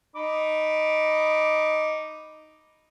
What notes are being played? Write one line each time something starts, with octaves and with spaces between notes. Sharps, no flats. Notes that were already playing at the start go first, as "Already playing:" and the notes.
D#4 B5 D6